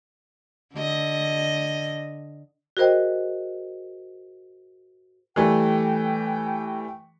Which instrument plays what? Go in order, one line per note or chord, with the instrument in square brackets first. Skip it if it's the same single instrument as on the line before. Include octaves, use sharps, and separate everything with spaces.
[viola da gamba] D3 D#5
[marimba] F#4 G#4 A#4 C5 D#5 G5
[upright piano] E3 G3 A3 [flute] G5